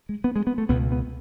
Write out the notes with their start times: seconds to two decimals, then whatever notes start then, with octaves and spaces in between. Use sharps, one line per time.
0.09 G#3
0.24 B3
0.36 G#3
0.47 B3
0.58 A3
0.69 C#2 B2 B3
0.92 B3